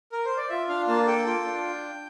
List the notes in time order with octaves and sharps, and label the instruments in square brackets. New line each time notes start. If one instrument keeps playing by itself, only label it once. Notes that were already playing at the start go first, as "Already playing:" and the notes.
[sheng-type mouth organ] A#4
C5
D5
F4 E5
D4 F5
A#3 A5
A4 G5
F4 G5
D4